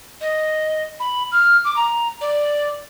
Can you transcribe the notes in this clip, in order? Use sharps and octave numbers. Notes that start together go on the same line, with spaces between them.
D#5
B5
F6
D6
A#5
D5